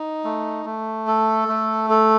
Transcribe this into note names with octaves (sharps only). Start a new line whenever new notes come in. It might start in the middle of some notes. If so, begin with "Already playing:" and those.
Already playing: D#4
A3
A3
A4
A3
A4